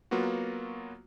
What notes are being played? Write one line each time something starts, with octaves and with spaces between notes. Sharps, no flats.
F#3 A#3 B3 F4 F#4